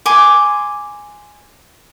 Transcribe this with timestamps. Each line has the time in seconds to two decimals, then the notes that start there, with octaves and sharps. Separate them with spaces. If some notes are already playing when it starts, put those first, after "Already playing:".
0.06 G#5 C6 D6